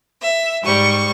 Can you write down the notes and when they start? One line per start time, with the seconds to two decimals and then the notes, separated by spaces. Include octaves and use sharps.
0.21 E5
0.63 G#2 G3 C#6